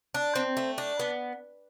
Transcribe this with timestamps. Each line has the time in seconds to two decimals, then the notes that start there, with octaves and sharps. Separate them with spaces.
0.14 D4
0.35 C4
0.57 A3
0.78 D4
1.00 B3